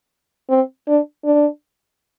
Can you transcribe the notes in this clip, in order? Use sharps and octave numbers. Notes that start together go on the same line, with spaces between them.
C4
D4
D4